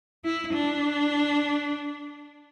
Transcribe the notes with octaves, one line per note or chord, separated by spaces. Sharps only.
E4
D4